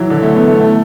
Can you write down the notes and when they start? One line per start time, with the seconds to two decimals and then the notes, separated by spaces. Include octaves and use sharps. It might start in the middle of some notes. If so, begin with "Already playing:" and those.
Already playing: E3 F#3
0.10 D3
0.23 A3
0.35 B3
0.48 A3
0.60 A3